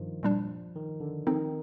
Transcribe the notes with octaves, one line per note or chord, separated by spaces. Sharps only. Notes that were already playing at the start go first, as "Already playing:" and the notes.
Already playing: G2 D#3 F3
A#2 G3 D4
D#3
D3
D3 D#3 F3 C4 D#4